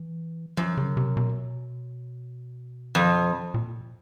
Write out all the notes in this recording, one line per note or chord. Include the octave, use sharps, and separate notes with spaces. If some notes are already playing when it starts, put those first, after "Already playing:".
Already playing: E3
F#2 F3
C#3
C3
B2
F2
A#2